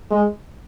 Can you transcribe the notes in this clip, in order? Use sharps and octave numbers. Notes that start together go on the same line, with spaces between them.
G#3